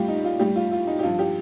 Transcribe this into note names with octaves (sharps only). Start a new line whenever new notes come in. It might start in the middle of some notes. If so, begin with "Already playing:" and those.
Already playing: A2 G3 F4 G4
D#4
F4
A2 G3 G4
F4
F4
D#4
G4
G2 F3 F4
G4